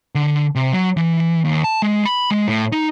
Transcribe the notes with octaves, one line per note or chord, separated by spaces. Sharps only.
D3
C3
F#3
E3
D#2
A5
G#3
B5
G#3
A2
D#4